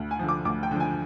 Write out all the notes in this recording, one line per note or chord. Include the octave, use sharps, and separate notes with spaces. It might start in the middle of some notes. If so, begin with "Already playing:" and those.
Already playing: D2
G#5
D3 F3
D6
D2 D6
G5
D3 F3
G#5